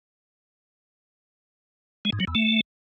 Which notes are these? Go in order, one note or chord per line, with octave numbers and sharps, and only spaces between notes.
G#3
G#2
F#3
E2
A3